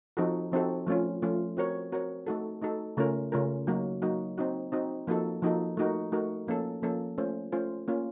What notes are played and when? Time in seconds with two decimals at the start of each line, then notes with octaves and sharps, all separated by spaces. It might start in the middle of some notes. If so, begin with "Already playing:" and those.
0.17 F3 C4 D#4 F#4 A4
0.52 F3 C4 D#4 F#4 A4
0.87 F3 A3 C#4 F4
1.22 F3 A3 C#4 F4
1.57 C4 F#4 A#4 C#5
1.92 C4 F#4 A#4 C#5
2.27 A3 D#4 F#4 A4
2.62 A3 D#4 F#4 A4
2.97 C#3 A3 C#4 F4 A#4
3.32 C#3 A3 C#4 F4 A#4
3.67 F#3 A#3 D#4 F#4 A#4
4.02 F#3 A#3 D#4 F#4 A#4
4.38 C4 D#4 F#4
4.72 C4 D#4 F#4
5.07 F3 A#3 D#4 F#4 A4
5.42 F3 A#3 D#4 F#4 A4
5.77 A3 D#4 F#4 A#4
6.12 A3 D#4 F#4 A#4
6.47 F3 A#3 C#4 A4
6.82 F3 A#3 C#4 A4
7.18 A3 C#4 F4 C5
7.52 A3 C#4 F4 C5
7.88 A#3 C#4 F4